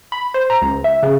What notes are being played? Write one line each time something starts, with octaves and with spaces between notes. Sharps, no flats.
B5
C5
A#5
C#2
E5
C#3